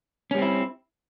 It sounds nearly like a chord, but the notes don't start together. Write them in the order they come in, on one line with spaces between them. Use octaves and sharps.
C#4 G3 C4 E4